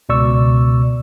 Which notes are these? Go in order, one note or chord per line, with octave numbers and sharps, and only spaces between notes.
C#2 B2 D5 C#6 E6